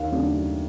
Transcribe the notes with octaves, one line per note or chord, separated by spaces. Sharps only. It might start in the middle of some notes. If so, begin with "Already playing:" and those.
Already playing: D#2 F5
C#3 F#3 A3 D4